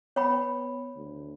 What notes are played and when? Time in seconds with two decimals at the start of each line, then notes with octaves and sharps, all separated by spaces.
0.16 B3 C#5 G5 B5
0.96 D2